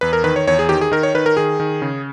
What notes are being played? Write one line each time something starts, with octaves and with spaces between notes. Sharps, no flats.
E2 B4
A#4
D#3 B4
C#5
E2 C#5
G#4
D#3 G4
G#4
D#3 A#4
C#5
D#3 B4
A#4
D#3 G#4
D#3
C#3